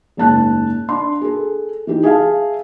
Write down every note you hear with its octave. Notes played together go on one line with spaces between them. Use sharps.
F#1 G#2 A5 F#6
D4 C6
G#4 A4
E3 D#4 G4
G#4 E5 F5 A5